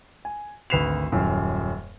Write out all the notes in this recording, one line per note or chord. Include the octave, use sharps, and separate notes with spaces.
G#5
G#1 D2 B4 C7 E7 F7
D#1 F#2